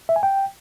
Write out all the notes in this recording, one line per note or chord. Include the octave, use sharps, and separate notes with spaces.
E5
G#5
G5